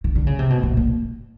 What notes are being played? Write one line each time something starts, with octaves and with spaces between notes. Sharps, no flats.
D#3
D3
C#3
C3
B2
A#2
A#2